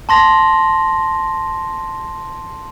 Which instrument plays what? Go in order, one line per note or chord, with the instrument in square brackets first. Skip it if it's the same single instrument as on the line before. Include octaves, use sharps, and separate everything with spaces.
[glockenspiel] A5 C6 A#6